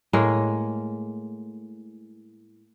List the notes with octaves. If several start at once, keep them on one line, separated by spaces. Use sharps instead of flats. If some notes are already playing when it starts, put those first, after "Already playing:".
A2 G#3 A#3